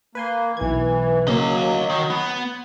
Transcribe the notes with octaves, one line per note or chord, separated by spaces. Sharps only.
A#3 B4 G#5 C6
B1 E3 G#6
C#3 F#3 A#3 D#5 F5
D#3 C6 G#6
B3